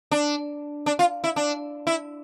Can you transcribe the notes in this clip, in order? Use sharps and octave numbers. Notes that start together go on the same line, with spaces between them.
D4
D4
F4
E4
D4
E4